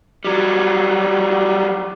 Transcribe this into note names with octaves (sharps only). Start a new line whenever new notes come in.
F#3 G3